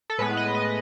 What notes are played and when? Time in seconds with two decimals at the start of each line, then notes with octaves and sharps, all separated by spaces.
0.10 A4
0.18 A2 G#3 B3 B4
0.37 D#5
0.55 D#5